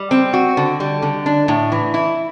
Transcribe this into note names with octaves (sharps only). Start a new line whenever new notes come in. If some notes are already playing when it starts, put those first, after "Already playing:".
Already playing: G3
C4
F#4
D3
G3
D3
D4
A2
E3
E4